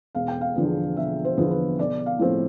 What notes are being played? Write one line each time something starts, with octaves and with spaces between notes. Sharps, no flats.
E1 F5
G5
F5
E2 D3 F3 B3
E1 E5
C5
E2 D3 F3 B3
B4
B1 D5
F5
A2 F3 A3 C4